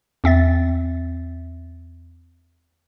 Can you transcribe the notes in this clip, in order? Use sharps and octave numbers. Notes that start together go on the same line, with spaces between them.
E2 C4 E5 A6